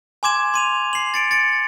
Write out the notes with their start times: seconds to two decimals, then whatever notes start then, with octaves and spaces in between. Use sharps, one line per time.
0.23 G#5 C6 D6 G#6 E7
0.54 C6 D#7 F7
0.93 C7 F#7
1.14 A6 C#7 D7
1.31 A6 C#7 D7